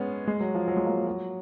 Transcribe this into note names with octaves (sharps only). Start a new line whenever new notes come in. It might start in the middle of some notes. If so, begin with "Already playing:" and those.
Already playing: G#3 B3 C#4
G#3
F#3
F3
F#3
G#3
A#3
F#3